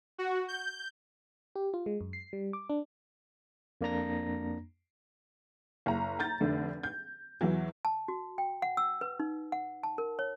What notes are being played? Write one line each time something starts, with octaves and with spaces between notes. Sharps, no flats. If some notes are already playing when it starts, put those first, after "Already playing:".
F#4
G6
G4
F4
G#3
F#2
C7
G3
D6
D4
F2 A#3 D4 A#5 A#6
F#1 A#5
A#5 G6 A6
F1 D3 A3
G6
E2 E3 F#3
A5
F#4
G5
F#5
E6
B4
D#4
F#5
A5
A#4
C#5